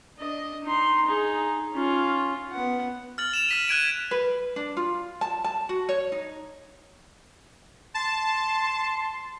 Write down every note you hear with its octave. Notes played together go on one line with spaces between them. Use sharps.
D4 D#5
D#4 C6
D#4 G#4
C#4 F4
B3 F#5
F6 A6 F#7
E7 F7
F6 B6 D#7
F#6 G#6 D7 D#7
B4
D4
F4
A5
A5
F#4
C#5
D#4
A5 C6